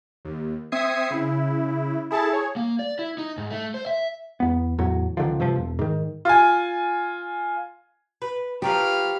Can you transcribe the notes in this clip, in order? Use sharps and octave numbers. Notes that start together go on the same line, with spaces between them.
D#2
C4 E5 D#6 G#6 C7 C#7
C#3 E4
E4 G#4 A4 A5
G#4 C#5
A#3
D5
E4
D#4
G#2
A3
C5
E5
E2 B3
E2 A2 F#3
C#2 D3 D#3 F3
G2 C3 F3
E1
G#2 D#3
F4 G#5
B4
F3 G4 A#4 B4 C#5 F5